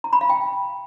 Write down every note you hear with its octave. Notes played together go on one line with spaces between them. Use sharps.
A#5
B5
F5
G5